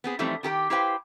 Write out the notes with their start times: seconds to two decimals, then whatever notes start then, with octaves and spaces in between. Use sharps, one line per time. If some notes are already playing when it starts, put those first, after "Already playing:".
0.04 B3 C4 G#4
0.19 E3 F3 G3 A3 C4 D#4
0.43 D#3 G4 A4 G5
0.70 E4 G4 B4 C5 F5 G5